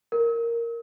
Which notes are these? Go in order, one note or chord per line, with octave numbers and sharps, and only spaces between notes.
A#4